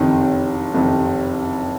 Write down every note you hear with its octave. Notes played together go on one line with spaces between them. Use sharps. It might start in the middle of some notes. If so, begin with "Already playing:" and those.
Already playing: F#1 F2 C3 D#3
F#1 F2 C3 D#3